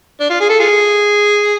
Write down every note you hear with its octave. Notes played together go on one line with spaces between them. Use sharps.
D4
F4
G#4
A4
F4 G#4